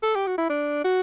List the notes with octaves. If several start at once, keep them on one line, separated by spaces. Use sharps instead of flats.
A4
G4
F#4
E4
D4
F#4